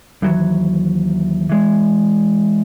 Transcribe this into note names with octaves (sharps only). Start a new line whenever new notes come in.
D#2 E3 F#3
E3 G#3